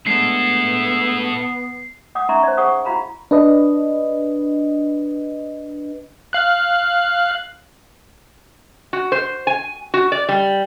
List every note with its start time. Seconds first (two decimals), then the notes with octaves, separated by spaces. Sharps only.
0.07 G#3 A3 B3 D4 E4 A4 C7
2.15 F#5 D6 D#6
2.29 C#4 D#4 E5 A#5 C6 C#6
2.43 C5 D5
2.57 G#4 F#5 C#6 D#6
2.85 E4 F#4 F5 A#5 B5
3.31 D4 B4 D#5
6.33 F5 F#6
8.93 F#4
9.12 C5
9.47 G#5
9.94 F#4
10.12 D5
10.29 G3